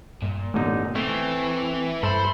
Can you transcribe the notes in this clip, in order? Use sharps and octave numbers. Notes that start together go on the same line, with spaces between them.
G2 A#2
A1 D3 A3 B3 D#4
E3 A3 C4 A5 C7
G2 A4 C5 E5 B5